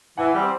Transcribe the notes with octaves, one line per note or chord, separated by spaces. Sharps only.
E3 F#5 G#5
G3 C4